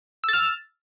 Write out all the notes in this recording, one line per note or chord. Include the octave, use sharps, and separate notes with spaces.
E6 F6 A6